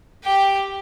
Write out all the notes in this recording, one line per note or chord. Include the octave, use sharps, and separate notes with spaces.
G4 G5